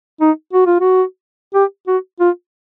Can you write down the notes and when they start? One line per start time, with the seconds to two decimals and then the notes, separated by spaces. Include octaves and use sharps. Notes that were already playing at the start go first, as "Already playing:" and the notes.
0.21 D#4
0.53 F#4
0.67 F4
0.80 F#4
1.54 G4
1.87 F#4
2.20 F4